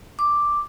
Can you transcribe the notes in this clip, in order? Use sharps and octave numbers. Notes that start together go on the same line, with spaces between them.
D6